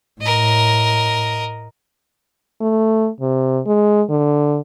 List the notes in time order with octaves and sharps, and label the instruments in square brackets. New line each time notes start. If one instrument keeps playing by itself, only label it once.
[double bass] A2 [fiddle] A#4 D#5
[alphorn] A3
C3
G#3
D3